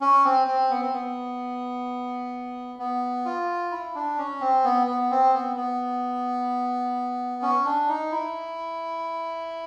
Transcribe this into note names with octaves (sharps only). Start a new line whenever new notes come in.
C#4
C4
C4
B3
C4
B3
B3
F4
E4
D4
C#4
C4
B3
B3
C4
B3
B3
C#4
D4
D#4
E4